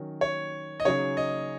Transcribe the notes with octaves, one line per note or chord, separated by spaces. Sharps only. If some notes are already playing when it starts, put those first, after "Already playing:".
Already playing: D#3 F#3 C#4 A#4
C#5
D#5
C#3 F#3 D#4 G#4 C#5
D#5